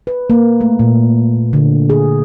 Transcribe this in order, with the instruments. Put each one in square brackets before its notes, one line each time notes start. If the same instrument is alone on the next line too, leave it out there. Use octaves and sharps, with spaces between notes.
[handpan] B4
A#3
A3
A#2
D3
G#4